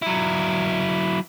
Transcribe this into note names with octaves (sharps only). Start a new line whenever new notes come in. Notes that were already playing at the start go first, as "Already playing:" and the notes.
F#3 E4